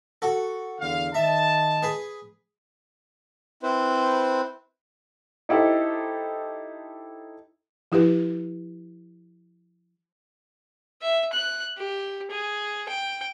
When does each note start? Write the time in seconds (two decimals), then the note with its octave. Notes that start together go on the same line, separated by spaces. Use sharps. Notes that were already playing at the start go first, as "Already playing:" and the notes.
0.22 F#4 A4
0.80 E2 D3 F5
1.14 D#3 D#5 E5 A5
1.83 G#4 B4
3.63 C4 E4 B4 C5
5.49 D#4 E4 G4 A4 C5
7.92 F3 E4 G4 B4
11.02 E5
11.33 F#6
11.78 G4
12.31 G#4
12.89 G5